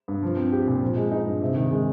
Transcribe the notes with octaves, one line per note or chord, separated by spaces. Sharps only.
G2
F3
C4
G4
A#2
F3
G#3
D#4
G2
C3
D#3
G#3